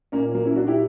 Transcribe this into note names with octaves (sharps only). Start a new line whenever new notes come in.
A#2 A#3 C#4
F#3 A#3
C#4 E4
A#2 D4 F#4
E4 G4